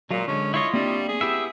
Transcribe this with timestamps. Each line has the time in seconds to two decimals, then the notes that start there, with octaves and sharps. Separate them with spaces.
0.11 A#2 F#3 G#3 F4
0.28 D3 G#3 C#4
0.54 E4 F4 C#5 D#5
0.74 G3 A#3 C4 D4
1.09 G#4
1.21 B3 E4 G4 E5